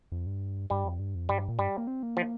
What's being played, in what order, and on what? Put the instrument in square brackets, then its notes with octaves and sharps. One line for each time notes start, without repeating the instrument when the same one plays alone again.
[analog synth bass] F2
G2
[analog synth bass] G2 [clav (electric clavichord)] G3
[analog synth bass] F2
G2
F2
[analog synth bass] G2 [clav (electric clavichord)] G3
[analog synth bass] A#2
[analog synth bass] G2 [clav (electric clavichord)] G3
[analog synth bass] A#3
C4
A#3
[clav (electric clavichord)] F3